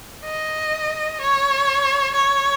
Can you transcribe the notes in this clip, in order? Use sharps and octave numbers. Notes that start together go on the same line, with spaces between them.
D#5
C#5
C#5